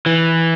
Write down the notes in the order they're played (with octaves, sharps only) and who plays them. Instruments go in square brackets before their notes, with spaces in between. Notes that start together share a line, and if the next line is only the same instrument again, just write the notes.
[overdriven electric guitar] E3